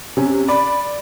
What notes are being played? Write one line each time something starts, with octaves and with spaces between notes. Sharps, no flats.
C3 C#4
D5 B5